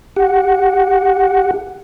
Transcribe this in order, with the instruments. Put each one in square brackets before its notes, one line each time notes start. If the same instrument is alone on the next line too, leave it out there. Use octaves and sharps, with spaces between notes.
[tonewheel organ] G4 F#5